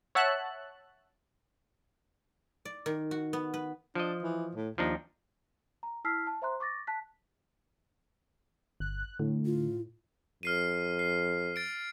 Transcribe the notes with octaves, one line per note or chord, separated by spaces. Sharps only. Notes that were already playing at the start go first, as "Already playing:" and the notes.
C#5 E5 F#5 A5 F#6
D5
D#3
F#4
B3
B4
F3 D4 D#5
E3
A2
D#2 F3 D4 D#4
A#5
E4 A5 E6 F6 B6 C7
A5
C5 E5 A#5 C6 F#6
C#6 D6 A6 A#6
A5 F#6 B6
G1 F#6
A2 D3
F4
F2 F6 C7 D#7
C7
A6 D7